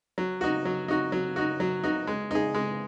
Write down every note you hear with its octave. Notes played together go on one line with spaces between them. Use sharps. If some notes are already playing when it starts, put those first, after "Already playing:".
F#3
D#4 F#4
F#3
D#4 F#4
F#3
D#4 F#4
F#3
D#4 F#4
G#3
D#4 G#4
G#3